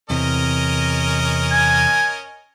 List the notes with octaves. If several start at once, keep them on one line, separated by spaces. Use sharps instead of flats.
E2 C3 C#4 A#4 D#5
G#5